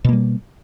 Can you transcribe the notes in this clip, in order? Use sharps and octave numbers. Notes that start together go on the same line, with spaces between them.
B2 G3 A#3